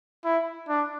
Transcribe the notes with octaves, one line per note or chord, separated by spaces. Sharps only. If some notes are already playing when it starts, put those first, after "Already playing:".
E4
D4